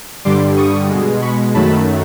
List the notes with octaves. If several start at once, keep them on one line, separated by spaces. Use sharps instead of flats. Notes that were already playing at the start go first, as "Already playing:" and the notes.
G2 D3 G3 C6 D6
C#6 D#6
B2 G#3
B5 C#6
F#2 D#3 F#3 A3 A5 B5